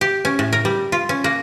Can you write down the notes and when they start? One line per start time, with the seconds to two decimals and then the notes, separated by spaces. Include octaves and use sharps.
0.01 G4
0.25 C#4
0.39 A2
0.53 A#4
0.65 G3
0.92 F4
1.09 C#4
1.24 A#3